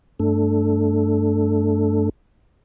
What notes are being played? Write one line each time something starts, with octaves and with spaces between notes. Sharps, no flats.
G2 A3 D4 A4